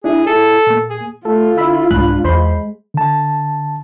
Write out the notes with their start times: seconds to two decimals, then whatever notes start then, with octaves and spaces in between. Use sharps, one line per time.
0.04 D4 E4 G#4
0.26 E4 G#4 A4
0.67 A#2 A#3
0.90 G#4
1.25 A3 F4 A4
1.57 D3 E4 E5 B5
1.90 C2 G#2 G#3 D4 B5 F#6
2.24 E2 G#3 C5 B5 C6
2.94 D3 A5